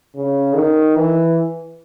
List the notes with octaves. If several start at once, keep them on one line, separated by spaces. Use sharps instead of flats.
C#3
D#3
E3